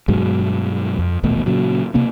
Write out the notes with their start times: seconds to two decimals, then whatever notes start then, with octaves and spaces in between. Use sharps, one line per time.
0.08 G2 B2 F#3 G#3
0.99 F2
1.23 D#1 A1 B2 A3
1.46 A#2 C#3 F#3
1.94 C3 A#3 C4